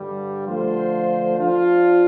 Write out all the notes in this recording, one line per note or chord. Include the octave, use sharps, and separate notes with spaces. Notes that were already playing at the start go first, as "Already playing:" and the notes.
Already playing: G2 D3 G3
D3 F3 A3 F4 C5
F3 D4 F4